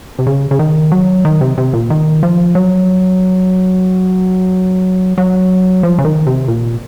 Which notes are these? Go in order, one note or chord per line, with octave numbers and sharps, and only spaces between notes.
C3
C#3
C#3
D#3
F#3
D#3
C3
C3
A#2
D#3
F3
F#3
F#3
F3
C#3
D#3
C3
A#2